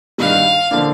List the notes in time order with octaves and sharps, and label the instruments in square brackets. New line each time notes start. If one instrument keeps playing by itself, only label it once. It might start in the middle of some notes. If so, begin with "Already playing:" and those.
[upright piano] G2 D#3 G3 [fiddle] F5
[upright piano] D3 F3 A#3 D4